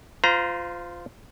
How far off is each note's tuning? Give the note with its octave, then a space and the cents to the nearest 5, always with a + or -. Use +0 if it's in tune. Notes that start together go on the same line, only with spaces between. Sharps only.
F4 +0 C5 -30 A#5 +10